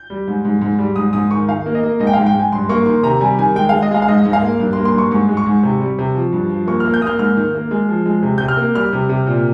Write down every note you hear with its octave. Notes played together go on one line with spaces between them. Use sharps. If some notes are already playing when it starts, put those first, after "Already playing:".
Already playing: G6
G3
G#2
G#2
G#2
G3
G#2 D#6
G#2 D#6
D#3 C#6
D#3 F5
A#3
D#5
A#3
G#2 D#5
G5
G#2 F5
G5
G#2
G#5
G2 C6
A#3 C#6
D#3 C6
C3 A#5
G3 G#5
D#3 G#5
G#3 G5
G#3 F5
D#5
G#3 F5
F5
G#2 D#5
G#2
F5
A#3
G2
C6
A#3
C6
G2 C#6
G#2 C#6
G#3
C#6
G#2
C3
G3
C3
F3
G2
F3
A#3 C#6
A#3 F6
G6
A#3 D#6
F6
G#2 F6
D#3
A#3
G#3
F3
G#3
C3
C3 G6
F6
A#3
G3 F6
C3
C3
A#2